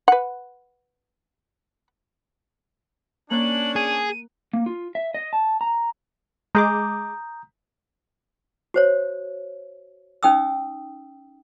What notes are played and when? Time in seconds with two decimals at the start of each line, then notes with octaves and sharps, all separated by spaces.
0.08 B4 F#5
3.31 A#3 C#4 D4 F#6 F#7
3.76 G#4 D#7
4.53 A#3
4.66 F4
4.95 E5
5.14 D#5
5.33 A5
5.61 A#5
6.55 G#3 G#4 A#5 D6 D#6 G6
8.74 F#4 C5 C#5
10.23 C#4 D#4 G5 D#6 E6